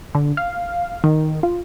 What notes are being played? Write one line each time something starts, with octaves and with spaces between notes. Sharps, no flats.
D3
F5
D#3
F4